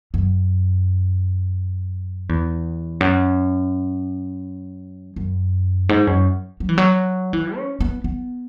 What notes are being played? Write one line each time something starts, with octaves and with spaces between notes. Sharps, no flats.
F#2
E2
F#2
F#2
G#2
F#2
F#3
E3
F#3
E3
C#4
B3
B3